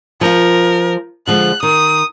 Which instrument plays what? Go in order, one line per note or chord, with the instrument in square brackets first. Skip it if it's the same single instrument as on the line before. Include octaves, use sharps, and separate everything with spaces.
[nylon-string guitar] F3 F4 [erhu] A#4
[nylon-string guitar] D3 F3 G#3 [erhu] F#6
[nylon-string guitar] D#3 [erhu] D#6